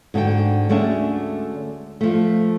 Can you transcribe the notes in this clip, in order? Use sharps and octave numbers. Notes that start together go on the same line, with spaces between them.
G#2 D3 F#4 G5
D2 G#3 A3 C#4 D4 E5
F3 A3